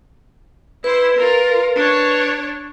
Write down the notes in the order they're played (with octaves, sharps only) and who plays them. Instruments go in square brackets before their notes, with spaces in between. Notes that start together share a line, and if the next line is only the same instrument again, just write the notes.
[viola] E4 C5 [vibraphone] B4
[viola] F4 A#4
D4 C#5